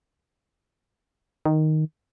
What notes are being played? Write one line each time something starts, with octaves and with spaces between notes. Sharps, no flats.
D#3